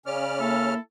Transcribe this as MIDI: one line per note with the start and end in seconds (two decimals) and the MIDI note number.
0.06 0.74 49
0.06 0.74 61
0.06 0.38 74
0.06 0.74 89
0.39 0.78 58
0.39 0.78 64
0.39 0.78 69